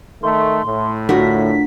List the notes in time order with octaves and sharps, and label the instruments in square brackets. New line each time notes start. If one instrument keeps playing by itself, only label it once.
[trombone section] D#3 A3 [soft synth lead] C6
[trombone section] A2
[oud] D2 [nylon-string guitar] F4 F#4 A#4 [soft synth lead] B6